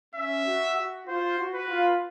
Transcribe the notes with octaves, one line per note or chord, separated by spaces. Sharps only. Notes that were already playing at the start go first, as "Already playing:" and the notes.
C#4 E5
F#4
F#4
F4 C5
F#4
B4
F4